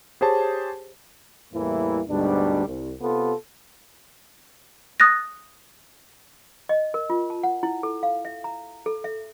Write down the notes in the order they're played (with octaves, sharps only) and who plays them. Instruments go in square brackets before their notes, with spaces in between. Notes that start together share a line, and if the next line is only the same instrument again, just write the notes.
[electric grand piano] G4 G#4 C5 C#5 A5
[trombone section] E2 A2 E3 G3 A#3 E4
D2 G#2 B2 G3 D4
C2
C3 B3 F4 A4
[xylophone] D#6 F#6 A6 A#6
[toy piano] D#5
A#4
F4
A5
F#5
E4
A4
F5
E5
A#5
A4
E5